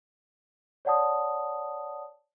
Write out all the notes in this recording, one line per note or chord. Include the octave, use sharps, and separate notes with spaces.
C#5 D5 F#5 A5 D#6